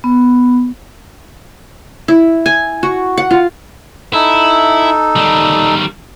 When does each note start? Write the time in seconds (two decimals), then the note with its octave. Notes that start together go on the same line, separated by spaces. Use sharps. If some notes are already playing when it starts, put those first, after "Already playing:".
0.04 B3
2.08 E4
2.46 G#5
2.83 F#4
3.18 F#5
3.31 F4
4.13 D#4 E4 A4
5.16 D#3 G3